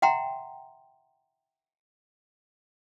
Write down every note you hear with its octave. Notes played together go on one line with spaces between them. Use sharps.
E5 F#5 G5 A#5 C6